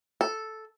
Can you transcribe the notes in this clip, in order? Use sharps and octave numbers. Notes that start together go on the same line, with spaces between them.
A4